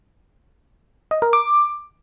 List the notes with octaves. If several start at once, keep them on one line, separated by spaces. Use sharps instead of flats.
D#5
A#4
D6